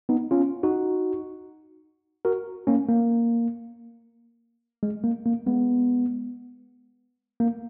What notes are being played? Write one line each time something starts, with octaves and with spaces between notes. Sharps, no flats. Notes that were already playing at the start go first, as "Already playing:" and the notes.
B3 D#4
C#4 F4
D#4 F#4
F#4 A#4
A#3 C#4
A#3
G#3
A#3
A#3
G#3 B3
A#3